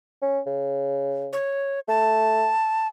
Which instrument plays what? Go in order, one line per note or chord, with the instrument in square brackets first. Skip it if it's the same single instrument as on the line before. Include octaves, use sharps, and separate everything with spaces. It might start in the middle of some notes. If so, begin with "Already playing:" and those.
[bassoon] C#4
C#3
[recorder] C#5
[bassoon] A3 [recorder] A5